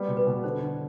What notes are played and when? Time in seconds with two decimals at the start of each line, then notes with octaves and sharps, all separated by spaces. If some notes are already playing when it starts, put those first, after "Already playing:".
Already playing: G3 B3
0.08 B2
0.17 B4
0.27 B2
0.44 D3 C5
0.61 D3